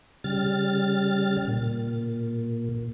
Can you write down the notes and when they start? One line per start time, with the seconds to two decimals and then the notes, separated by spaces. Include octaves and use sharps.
0.24 C#3 G3 F6 A6
1.48 A#2